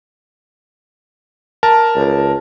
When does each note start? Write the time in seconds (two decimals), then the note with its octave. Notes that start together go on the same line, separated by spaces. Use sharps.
1.63 A#4 A5
1.95 C#2